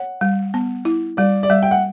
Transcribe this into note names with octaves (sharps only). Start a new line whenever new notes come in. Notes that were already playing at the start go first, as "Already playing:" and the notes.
Already playing: C#5 F#5
G3
B3
E4
G3 D5
D5
G3 E5
G5
F#5